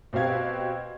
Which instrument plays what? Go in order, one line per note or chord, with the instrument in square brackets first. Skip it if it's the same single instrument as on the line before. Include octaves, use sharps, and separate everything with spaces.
[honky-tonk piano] B2 C4 G4 F5 G#6